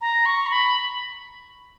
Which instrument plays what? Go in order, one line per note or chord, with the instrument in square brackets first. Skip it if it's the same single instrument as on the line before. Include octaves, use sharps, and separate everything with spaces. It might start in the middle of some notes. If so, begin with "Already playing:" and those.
[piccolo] A#5
C#6
A#5
B5